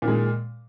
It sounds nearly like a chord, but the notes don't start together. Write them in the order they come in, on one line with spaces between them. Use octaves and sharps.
A#2 D#3 G#3